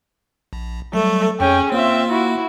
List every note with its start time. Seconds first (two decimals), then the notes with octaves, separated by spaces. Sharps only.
0.53 A#1
0.93 F#3 G3 A3 A4
1.40 F2 C#4 G#4 G5
1.72 A#3 C4 F4 E5
2.10 E4 F#4